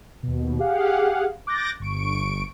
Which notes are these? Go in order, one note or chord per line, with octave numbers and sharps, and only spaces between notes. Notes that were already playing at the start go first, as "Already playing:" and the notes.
D#2 B2
G4 G#4 F5 F#5
D6 F#6 G6 A6 A#6
G1 C#6 D7